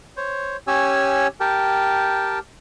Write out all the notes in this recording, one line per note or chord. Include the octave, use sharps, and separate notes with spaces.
C5 C#5
C#4 G4 C#5 G#5 E6
G4 A#4 G5 A5